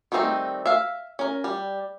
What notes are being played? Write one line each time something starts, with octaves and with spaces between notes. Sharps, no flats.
D#3 G3 A3 C4 D#4
E5 F5
C#4 A#4
G3